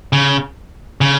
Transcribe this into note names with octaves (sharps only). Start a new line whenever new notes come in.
C#3
C#3